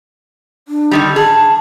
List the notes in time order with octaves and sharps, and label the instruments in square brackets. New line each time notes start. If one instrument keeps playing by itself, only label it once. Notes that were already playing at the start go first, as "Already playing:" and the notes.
[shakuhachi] D4
[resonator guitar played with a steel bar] D3 D#3 G3
[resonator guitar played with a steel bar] G#4 [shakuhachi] A5